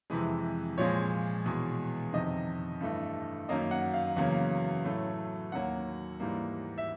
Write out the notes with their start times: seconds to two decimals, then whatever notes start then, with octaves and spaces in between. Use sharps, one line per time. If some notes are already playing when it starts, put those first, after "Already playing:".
0.10 F2 C3 E3 G#3
0.78 A#2 F3 G#3 C#5
1.46 E2 B2 G#3
2.13 F2 C3 D#3 D#5
2.81 G2 E3 A3
3.49 F#2 D#3 F#3 A#3 D#5
3.71 F#5
3.94 F5
4.16 E2 C#3 F#3 A#3
4.84 A2 F#3 A3
5.52 D#2 D#3 F#3 A#3 F#5
6.20 G#2 E3 G3 A#3
6.78 E5